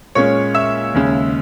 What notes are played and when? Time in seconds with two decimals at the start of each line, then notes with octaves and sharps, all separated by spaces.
0.15 A#2 G#3 C#4 C#5 C#6
0.55 E5 E6
0.94 D#2 C#3 G#3 C#4